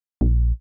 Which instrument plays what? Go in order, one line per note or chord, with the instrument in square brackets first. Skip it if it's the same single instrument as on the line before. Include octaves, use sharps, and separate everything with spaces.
[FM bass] A#1